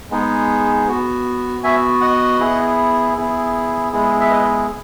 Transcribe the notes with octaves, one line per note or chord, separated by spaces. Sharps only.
G#3 B3 D#4 G#4
B3 F#4
B3 F#4 E5 G#5
D#5 F#5
B3 E4 G#4
B3 E4 G#4
G#3 B3 E4 G#4
E5
B4 D#5